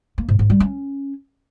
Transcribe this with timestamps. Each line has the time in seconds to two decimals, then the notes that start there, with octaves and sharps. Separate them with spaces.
0.18 A#3
0.28 G#2
0.39 G#2
0.50 G3
0.60 C#4